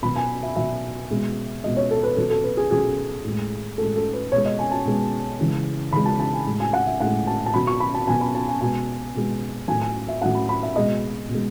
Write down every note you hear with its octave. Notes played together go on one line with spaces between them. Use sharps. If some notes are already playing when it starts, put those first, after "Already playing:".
B2 F#3 B5
G#5
E5
B2 F#3 E5
B2 G#3
B2 G#3 D#5
C#5
A4
B4
B2 F#3 A4
A4
B4
G#4
B2 F#3 G#4
A2 G#3
A2 G#3 A4
A4
B4
B2 G#3 C#5
D#5
G#5
A5
B2 G#3
C#3 E3 G#3
C#3 E3 G#3 B5
A5
A5
G#5
A2 G#3
G#5
F#5
E5
A2 G#3 F#5
A5
A5
B2 F#3 B5
C#6
B5
A5
B2 F#3 G#5
B5
A5
G#5
B2 G#3 G#5
B2 G#3
A2 F#3 G#5
G#5
E5
A2 F#3 F#5
B5
B5
E5
B2 G#3 D#5
B2
G#3